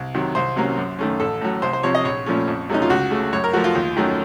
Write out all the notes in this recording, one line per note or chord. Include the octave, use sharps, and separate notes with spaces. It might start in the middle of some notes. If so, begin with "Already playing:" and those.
Already playing: C2
C3 D#3 F#3
C2 C5
C3 F#3 A#3 C#4
F#2
D#3 A3 C#4
A1 A4
A2 F#3
C2 C5
C5
C3 F3 C4 C#5
D#5
A#1 C#5
A#2 F3 A3 C#4
F2
C3 F#3 A3 C#4 D#4
F4
C#2 F#4
C#3 A3
F#2 C#5
A#4
F3 A3 F#4
F4
D#2
D#3 F#3 A3 C#4